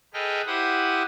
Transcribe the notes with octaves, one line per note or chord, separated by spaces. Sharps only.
G#4 A4 B4 D#5 G5 F6
E4 G4 C5 F#5 D#6